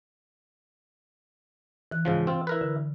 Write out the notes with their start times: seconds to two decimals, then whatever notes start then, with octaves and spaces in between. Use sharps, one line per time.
1.92 E3 F#6
2.05 G#2 C#3 F3
2.27 C4 F4
2.47 E4 A#4 B4
2.61 D3